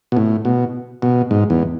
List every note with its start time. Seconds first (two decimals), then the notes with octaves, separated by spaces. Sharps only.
0.12 B2
0.17 A2
0.45 B2
1.02 B2
1.31 G#2
1.50 E2